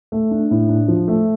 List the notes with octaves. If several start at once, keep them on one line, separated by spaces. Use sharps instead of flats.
A3
D4
A2
D4
F3
A3